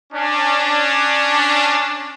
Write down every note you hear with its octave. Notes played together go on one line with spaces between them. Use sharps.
C#4 D4